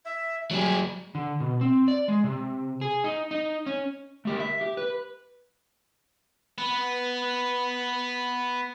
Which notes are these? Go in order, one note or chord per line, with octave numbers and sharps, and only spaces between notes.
E5
F#3 G3 G#4
D3
B2
C4
D5
G#3
C3
G#4
D#4
D#4
C#4
A3 G4 A#4
E5
G4
B4
B3 B4